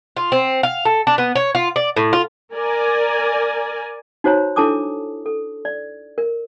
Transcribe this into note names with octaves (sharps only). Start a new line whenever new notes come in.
F4
C4
F5
A4
D4
B3
C#5
F4
D5
A2
F4
A#4 D5 G#5
D#4 F#4 C5 C#5 A#5
D4 E4 A4 A5 D6 D#6
A4
D5
A#4